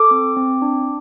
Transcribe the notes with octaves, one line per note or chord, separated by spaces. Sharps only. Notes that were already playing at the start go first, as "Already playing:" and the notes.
Already playing: A4 D6
C4
C4
D4